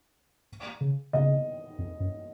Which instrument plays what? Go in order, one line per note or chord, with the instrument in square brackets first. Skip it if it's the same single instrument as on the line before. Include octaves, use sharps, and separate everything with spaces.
[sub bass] C#3
[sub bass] C#3 [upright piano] D#5
[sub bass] F2
F#2